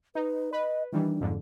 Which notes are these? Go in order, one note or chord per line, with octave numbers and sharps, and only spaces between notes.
D#4 B4
B4 D#5
D#3 E3 G3 D4
F2 G#2 D3